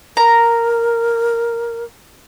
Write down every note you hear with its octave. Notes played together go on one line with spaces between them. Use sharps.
A#4 A#5